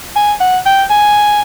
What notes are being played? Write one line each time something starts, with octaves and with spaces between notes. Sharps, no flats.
G#5
F#5
G5
G#5